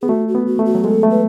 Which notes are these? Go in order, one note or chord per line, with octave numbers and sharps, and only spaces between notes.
B3 G#4
A3 F#4
F#4
B3
F#4
A3
F#4
F#3
G#3 A4
A3
B4